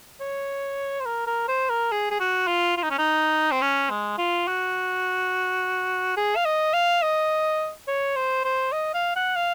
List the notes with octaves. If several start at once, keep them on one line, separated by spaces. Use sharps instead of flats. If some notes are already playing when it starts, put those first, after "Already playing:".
C#5
C5
A#4
A#4
C5
A#4
G#4
G#4
F#4
F4
F4
D#4
C#4
D#4
C4
C#4
G#3
F4
F#4
G#4
F5
D#5
F5
D#5
C#5
C5
C5
D#5
F5
F#5
F5